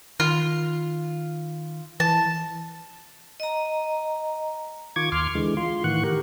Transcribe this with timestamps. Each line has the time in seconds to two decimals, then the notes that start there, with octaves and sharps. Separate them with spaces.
0.20 D#3 F4
2.00 E3 A5
3.40 D#5 A#5
4.96 D#3 F4 C#6 D6 G#6
5.12 D#2 C6 D6 F6
5.35 D3 E3 G#3
5.57 F4 C6
5.84 A2 D#3 E3 F#5 C#6 F#6
6.04 D#3 G4 A#4